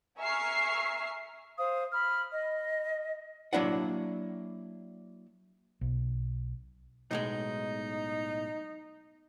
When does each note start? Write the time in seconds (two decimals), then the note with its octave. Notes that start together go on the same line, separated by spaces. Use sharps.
0.18 E5 G#5 A#5 C#6 F6 C7
1.58 C5 F5 D#6
1.92 B5 F6
2.30 D#5
3.53 F#3 A#3 D4 E4 D5 F#5
5.81 B1
7.11 B1 A2 G#3 D#4